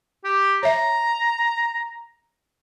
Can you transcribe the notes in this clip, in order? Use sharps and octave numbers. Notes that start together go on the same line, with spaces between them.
G4
C#5 E5 A#5